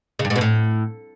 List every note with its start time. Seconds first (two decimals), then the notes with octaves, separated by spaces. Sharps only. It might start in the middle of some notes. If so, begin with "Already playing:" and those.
0.19 C#3
0.25 G2
0.30 G#2
0.36 B2
0.41 A2